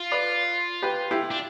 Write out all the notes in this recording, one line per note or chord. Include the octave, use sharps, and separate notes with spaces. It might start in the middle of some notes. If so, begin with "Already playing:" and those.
Already playing: F4
B4 D5
G4 B4
E4 G4
D4